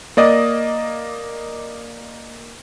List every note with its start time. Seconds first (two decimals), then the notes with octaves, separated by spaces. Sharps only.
0.17 A#3 D5 D#5